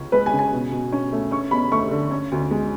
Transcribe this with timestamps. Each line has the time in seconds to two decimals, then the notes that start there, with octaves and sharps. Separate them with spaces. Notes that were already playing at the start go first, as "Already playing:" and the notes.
Already playing: C#2 C#3 C#4
0.12 G#3 B4
0.26 G#5
0.33 C#3
0.39 G#5
0.52 B2
0.71 B2
0.93 C#4
1.12 A3
1.31 C#4 C#6
1.51 E2 B5
1.72 A3 C#6
1.91 D3
2.11 C#4
2.32 D2
2.51 G#3